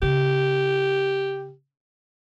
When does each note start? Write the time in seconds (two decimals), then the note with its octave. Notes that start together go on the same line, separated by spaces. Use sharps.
0.02 C#3 G4